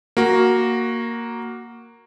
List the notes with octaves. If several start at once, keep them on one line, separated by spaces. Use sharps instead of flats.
A#3 F#4